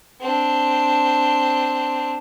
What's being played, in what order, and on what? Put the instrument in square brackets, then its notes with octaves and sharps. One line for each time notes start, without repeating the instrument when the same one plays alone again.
[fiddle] C4 D4